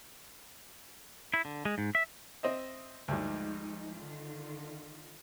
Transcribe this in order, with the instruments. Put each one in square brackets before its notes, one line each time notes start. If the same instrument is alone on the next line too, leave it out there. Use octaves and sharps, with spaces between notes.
[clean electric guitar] E4
D3
G#3
G#2
E5
[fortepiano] C4 D#5 E5
[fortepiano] D2 G2 [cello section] F3 G#3 D#4
[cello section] D3 D#3 F4